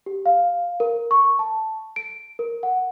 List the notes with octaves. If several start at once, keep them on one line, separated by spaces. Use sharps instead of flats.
G4
F5
A#4
C#6
A5
D7
A#4
F#5